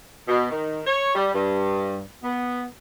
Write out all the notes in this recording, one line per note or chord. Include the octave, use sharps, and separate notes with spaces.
B2
D#3
C#5
G3
G2
B3